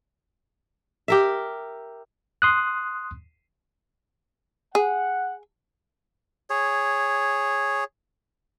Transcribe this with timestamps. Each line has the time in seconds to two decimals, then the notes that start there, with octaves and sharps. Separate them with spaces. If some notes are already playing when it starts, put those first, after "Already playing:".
1.08 G4 A#4 E5
2.42 C6 D#6 F#6
4.75 G#4 F#5
6.50 G#4 C#5